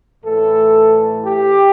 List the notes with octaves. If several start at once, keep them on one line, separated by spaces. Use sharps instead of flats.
A2 E3 A3 A4
G4